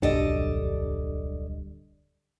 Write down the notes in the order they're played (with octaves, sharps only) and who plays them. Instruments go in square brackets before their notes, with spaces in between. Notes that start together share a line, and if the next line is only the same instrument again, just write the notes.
[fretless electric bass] D1 B1 F#2 [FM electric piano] D3 G3 [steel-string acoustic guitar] A4 D5 D#5